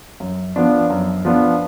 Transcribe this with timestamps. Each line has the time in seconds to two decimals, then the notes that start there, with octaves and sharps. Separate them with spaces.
0.20 F#2
0.56 F3 B3 D4
0.90 F#2
1.25 F3 B3 D4